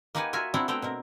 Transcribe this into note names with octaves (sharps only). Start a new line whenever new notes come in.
A#3 D#4 G4 B4 F#5 G#5
F4 F#4 A#4 E5 G#5
C4 D4 E4 A#4 F#5
A3 B3 E4 C5 G5 A#5
B2 C4 A#4